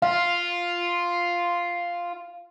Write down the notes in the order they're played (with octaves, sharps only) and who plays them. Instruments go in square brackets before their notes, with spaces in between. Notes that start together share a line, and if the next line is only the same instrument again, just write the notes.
[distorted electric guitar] F4 [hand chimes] F5